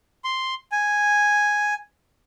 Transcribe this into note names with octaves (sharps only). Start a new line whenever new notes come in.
C6
G#5